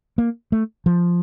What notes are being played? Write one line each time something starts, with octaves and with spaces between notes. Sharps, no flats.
A#3
A3
F3